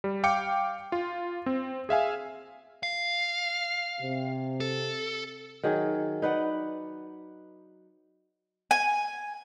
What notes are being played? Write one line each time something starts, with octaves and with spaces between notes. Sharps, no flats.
G3
F5 G5 D6 C#7
F4
C4
G#4 E5 F5 G#5
F5
C3
A4
D#3 F#3 G#4
D#4 B4 D5 F#5
G#5